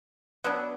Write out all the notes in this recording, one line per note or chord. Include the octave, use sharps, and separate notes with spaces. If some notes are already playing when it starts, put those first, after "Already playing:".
F#3 B3 D4